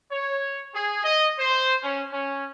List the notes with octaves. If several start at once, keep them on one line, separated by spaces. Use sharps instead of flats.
C#5
G#4
D#5
C5
C#4
C#4